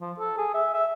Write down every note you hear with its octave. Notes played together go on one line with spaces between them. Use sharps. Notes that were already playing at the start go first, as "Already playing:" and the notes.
F3
A4
G#4
E5
E5